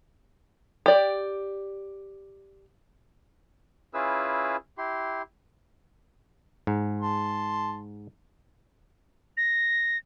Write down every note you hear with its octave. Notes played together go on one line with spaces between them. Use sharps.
G4 D5
C#4 E4 F4 G#4 B4 E6
E4 G4 C6
G#2
A5 C6
A#6